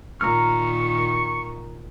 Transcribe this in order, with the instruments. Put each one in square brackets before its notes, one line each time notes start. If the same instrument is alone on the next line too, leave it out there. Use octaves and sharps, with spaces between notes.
[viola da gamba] A#2 D#3 [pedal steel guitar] A#5 F6 [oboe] C#6